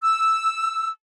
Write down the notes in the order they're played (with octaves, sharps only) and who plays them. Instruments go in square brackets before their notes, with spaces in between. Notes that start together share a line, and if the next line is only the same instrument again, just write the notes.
[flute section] E6